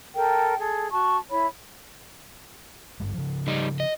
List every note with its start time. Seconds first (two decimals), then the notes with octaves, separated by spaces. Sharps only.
0.16 A4 A#4 G5
0.60 G#4 A4
0.91 F#4 A5 C#6
1.30 E4 C#5 B5
3.00 G#1 G2 G#3
3.14 C#3 F3
3.48 G3 D#4
3.80 D#5